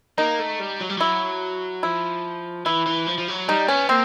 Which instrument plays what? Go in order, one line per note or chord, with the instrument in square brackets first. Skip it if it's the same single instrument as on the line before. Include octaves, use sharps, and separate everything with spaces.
[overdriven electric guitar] A#3 [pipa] D#4
[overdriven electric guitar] A3
G3
F#3
G3
[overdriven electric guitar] F#3 [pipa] E4
[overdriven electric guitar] F3 [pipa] E4
[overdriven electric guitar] E3 [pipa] E4
[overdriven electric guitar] E3
F3
F3
F#3
[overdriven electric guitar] G3 [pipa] D#4
[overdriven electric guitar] B3 [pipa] C#4
[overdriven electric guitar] A#3 [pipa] C4